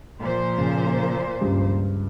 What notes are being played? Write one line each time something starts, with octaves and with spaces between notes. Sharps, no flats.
A#2 F3 C5
C#3
C#2 G2